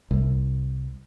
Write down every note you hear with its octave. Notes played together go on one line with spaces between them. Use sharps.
C2